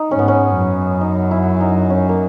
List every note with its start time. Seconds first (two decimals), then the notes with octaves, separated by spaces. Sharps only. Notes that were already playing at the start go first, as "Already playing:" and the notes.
Already playing: D#4
0.11 G#2 C#4
0.19 B3
0.28 C#4
0.56 F#2
1.01 D#4
1.31 E4
1.60 D#4
1.90 C#4
2.09 A#3